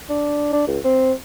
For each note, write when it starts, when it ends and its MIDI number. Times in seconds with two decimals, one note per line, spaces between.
0.09 0.50 62
0.53 0.63 62
0.67 0.78 37
0.84 1.12 60